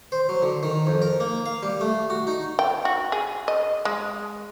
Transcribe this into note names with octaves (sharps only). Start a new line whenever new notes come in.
C5
F#3
D3
D#3
F2
A#4
A#3
F5
G3
A3
F#4
D#4
G5
F#4
G#4
D#5
G#3